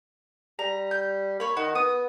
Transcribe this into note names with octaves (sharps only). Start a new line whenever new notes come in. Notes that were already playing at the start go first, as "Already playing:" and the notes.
G3 A#5
G6
A#3 C#5 B5
D#3 F#4
B3 D#6